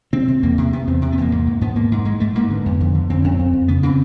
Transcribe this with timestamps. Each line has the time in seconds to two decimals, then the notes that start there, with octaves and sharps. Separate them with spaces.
0.13 C3 C4
0.28 C3
0.43 E2 A#3
0.58 C3
0.73 C3 B3
0.87 E2 C4
1.02 C3
1.12 B3
1.17 E2 A#3
1.32 G#2
1.47 G#2
1.61 G#2 B3
1.76 G#2 A#3
1.92 G#2
2.05 G#2 G#3
2.20 G#2 A3
2.35 G#2 A#3
2.50 D3 B3
2.66 F2
2.80 D3
2.94 D3
3.10 F2 C4
3.22 F2 C#4
3.35 F2 C4
3.53 F2
3.68 C#3 B3
3.83 C#3 C4